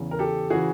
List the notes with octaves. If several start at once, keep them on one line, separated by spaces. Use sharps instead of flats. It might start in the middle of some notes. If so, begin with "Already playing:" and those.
Already playing: E2 C#3 E3
A#4
G4 A4
C#3 E3 F#4 G#4